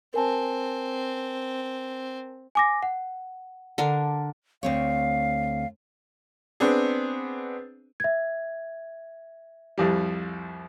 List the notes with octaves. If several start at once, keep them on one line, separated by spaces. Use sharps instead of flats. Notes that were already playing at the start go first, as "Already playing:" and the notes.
C4 A#4 G#5 A5
G#5 D6 A#6
F#5
D3 D4 A#4
D2 C4 C#5 F5
B3 C4 D4 G#4
E5 G#6
C2 F2 G3